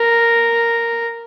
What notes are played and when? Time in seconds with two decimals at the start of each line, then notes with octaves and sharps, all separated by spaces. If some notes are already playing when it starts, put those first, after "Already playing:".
Already playing: A#4